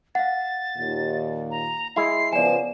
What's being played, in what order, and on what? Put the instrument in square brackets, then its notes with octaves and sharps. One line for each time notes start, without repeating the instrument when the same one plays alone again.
[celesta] F5 F#5 [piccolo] A6
[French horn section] D#2 A#2
[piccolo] A#5
[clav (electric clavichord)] G#3 E4 [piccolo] C7
[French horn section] C#3 F3 B3 [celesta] D5 G#5 [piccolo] E7